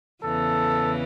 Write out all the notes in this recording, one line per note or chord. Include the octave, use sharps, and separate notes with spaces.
E2 C#3 E3 A4